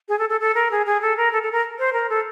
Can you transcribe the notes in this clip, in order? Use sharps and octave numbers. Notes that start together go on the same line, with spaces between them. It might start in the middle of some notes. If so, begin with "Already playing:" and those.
G#4
A4
A4
A4
A#4
G#4
G#4
A4
A#4
A4
A4
A#4
C5
A#4
A4